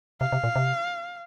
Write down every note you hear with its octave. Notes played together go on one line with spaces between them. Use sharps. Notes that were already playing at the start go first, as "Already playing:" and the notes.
C3 F5
C3
A#2
C3